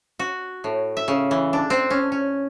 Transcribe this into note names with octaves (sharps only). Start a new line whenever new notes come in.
F#4
A2
E5
C#3
E3
D4
C4
C#4
C#4